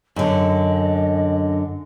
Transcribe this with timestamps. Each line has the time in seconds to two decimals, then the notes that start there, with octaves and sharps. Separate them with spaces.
0.16 F#2 D3 D#5